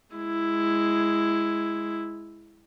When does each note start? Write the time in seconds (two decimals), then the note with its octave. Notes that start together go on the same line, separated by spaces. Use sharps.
0.15 G#3 E4